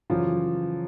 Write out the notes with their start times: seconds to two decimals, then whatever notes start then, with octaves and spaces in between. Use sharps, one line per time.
0.10 F#2 C#3 E3 F3 F4